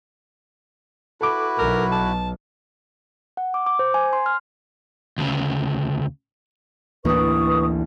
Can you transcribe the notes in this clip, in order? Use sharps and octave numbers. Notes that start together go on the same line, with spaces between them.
E4 F#4 A4 B4 D6
B1 A#4
A5
F#5
D6
D6
C5
G#5
C6
F6
D2 C#3
A1 D2 E3 A#3 D4 B4 C#6 D#6